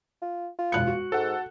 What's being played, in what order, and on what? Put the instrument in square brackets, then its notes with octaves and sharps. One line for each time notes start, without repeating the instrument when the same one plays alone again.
[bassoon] F4
F4
[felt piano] E1 F#6 C#7
F#4
[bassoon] G#2 [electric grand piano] A4 F#5